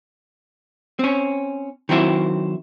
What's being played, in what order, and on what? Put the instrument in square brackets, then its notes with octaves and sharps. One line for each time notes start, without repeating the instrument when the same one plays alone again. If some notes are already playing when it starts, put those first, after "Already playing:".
[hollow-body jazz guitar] C4 C#4
D#3 F#3 C4 E4